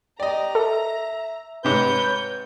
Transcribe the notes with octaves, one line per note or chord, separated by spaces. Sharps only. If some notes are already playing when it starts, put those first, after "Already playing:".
G4 D5 D#5 A#5
A4 E5
G#2 C3 B4 C#5 G6